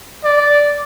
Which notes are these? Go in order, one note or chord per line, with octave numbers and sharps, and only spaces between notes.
D5